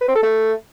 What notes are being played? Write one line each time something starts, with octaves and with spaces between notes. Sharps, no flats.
B4
C4
A4
A3